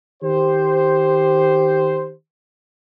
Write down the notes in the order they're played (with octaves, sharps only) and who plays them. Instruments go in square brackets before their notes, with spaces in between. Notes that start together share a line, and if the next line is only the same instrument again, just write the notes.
[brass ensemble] D#3 G4 C5